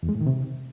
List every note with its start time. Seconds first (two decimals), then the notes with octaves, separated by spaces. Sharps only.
0.03 E2
0.09 G#3
0.15 A2
0.21 D#3
0.27 C3